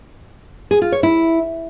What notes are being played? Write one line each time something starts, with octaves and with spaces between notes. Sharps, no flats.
G#4
F4
C#5
E4